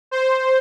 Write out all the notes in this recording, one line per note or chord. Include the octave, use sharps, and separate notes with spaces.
C5